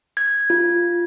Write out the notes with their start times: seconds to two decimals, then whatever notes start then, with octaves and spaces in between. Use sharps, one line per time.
0.17 G#6
0.50 F4